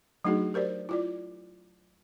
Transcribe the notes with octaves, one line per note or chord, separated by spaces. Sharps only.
F#3 A3 D4 D#4 F#4 G#4
G4 A#4 C5 D5
E4 F4 D5